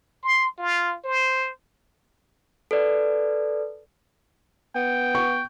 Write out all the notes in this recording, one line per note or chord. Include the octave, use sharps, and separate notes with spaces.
C6
F4
C5
A4 B4 D5
B3 G5
C#6